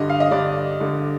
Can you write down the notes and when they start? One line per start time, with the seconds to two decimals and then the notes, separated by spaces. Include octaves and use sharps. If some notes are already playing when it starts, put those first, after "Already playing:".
Already playing: G2 D3 D#5
0.10 F5
0.20 D#5
0.31 G2 D3 D5
0.80 G2 D3